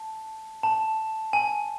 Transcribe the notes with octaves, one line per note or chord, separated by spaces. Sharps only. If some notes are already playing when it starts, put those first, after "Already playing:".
Already playing: A5
A5
G#5